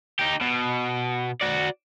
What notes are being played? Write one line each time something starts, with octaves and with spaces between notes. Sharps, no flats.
D#4 G4
B2
F#4 D5